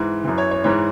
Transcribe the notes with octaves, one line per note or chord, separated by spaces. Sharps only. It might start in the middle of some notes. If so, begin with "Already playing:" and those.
Already playing: G#2 E3
F#2 E3
C#5
C#5
G#2 E3 C#5